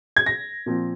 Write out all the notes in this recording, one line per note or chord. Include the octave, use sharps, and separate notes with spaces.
G#6
A#6
A#2 F3 C4